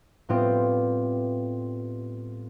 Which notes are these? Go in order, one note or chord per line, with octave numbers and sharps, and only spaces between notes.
A2 G3 B3 C4 F4 G4